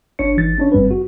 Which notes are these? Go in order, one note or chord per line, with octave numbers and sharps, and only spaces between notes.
G1 D4 C#5 C#7
G1 E3 D#4 A6
C#4 D4 C#5
G1 G2 G3 C4 B4
F#4